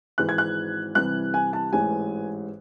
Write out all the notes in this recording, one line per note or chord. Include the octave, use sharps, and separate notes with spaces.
G#1 G#2 E3 F#6
G#6
F#6
C2 C3 E3 F#6
G#5
A5
A1 G#2 E3 G#5